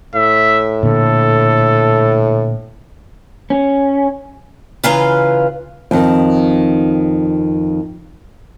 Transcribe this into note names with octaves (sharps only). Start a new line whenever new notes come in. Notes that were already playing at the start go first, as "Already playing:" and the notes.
A2 E5
A#2 D3 A4
C#4
C#3 E3 F4 B4 F5 A#5
F2 D#3